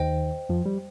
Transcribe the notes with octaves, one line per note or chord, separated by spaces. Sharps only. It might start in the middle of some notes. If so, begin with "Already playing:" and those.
Already playing: D#2 D#3 C5 D#5 G5
F2 F3
G3